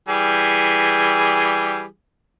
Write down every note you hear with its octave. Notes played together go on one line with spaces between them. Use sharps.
E3 G3 G#4